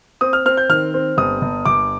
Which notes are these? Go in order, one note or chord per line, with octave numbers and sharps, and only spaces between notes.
C4 D#6
F6
C4 F6
G6
D#3 F6
C4
G1 D#6
G1
G1 D6